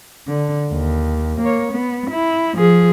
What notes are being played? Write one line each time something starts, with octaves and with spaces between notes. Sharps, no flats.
D3
D#2
A#3 C#5
B3
E4
F3 G#4